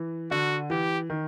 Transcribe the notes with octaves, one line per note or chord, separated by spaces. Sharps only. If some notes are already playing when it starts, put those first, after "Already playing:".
Already playing: E3
D3 F#4
E3 G4
D#3